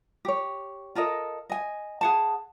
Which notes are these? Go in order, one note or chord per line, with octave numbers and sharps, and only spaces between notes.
G4 C#5
F4 A4 A#4 D#5
D#5 G#5
G#4 F#5 A5